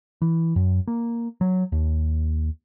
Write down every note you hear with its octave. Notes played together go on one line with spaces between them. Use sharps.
E3
F#2
A#3
F#3
D#2